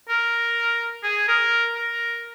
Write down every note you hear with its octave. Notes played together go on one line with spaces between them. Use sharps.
A#4
G#4
A#4
A#4